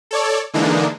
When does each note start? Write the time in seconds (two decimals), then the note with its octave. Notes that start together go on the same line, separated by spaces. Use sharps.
0.11 A4 C#5 D5
0.54 D3 E3 G#3 A#3 D4 D#4